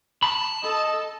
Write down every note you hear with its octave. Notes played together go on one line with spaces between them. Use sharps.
A5 B5
A4 D#5